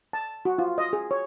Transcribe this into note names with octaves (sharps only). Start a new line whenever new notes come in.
A5
F#4
F4
D#5
G#4
C#5